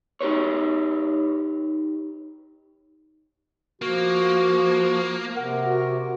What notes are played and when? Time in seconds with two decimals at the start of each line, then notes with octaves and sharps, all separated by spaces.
0.21 D#4 G4 B4 C#5
3.82 F3 A#3 F#4
5.36 C3 A#4 F#5
5.65 F#4